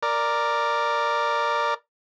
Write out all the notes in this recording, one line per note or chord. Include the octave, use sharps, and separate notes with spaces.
A#4 D5